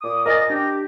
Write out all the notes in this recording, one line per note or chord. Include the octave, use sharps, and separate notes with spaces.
A#2 D6 D#6
A#4 C5 D#5 G#5 A6 A#6
D4 G4